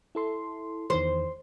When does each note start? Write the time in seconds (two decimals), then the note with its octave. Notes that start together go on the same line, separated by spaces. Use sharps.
0.15 E4 A4 C6
0.90 E2 D#3 E3 C5